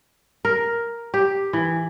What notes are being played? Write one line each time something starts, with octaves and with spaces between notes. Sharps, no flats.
A#4
G4
E3